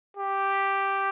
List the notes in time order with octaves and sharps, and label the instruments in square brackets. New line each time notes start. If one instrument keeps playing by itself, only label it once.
[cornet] G4